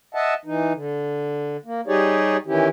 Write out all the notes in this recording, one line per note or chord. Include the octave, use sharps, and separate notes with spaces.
D#5 E5 F#5 A5
E3 D#4
D3
A#3
G3 D#4 G4 G#4 C#5 D5
D#3 E3 C#4 E4 G4